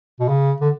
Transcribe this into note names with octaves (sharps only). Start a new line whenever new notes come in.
B2
C#3
D3